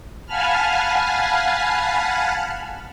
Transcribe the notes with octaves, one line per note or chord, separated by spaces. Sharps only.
F5 F#5 G#5 A5 B5 F6